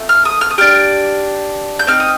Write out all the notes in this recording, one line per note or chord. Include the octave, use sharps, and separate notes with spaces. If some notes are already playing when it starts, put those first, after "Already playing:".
Already playing: A3 C4 F4 A4
F6
D#6
F6
D#6
D4 G4 F6
G6
C4 D#4 F6
D#6